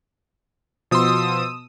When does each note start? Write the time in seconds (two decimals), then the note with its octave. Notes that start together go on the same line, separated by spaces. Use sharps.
0.91 B2 F3 C6 D#6 E6